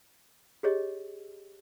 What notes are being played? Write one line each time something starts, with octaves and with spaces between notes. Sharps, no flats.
G4 G#4 C#5 D#5